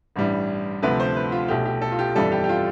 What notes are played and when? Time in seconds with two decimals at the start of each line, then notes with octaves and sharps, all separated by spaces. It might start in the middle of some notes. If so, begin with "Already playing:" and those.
0.16 A1 G2 E3 G3
0.82 D2 C3 F3 A3 B4
1.00 C5
1.16 B4
1.32 F4
1.48 B1 B2 A3 G4
1.65 G4
1.82 A4
1.92 F4
1.99 G4
2.16 G1 F2 E3 G3 A4
2.32 G4
2.44 G4
2.49 F4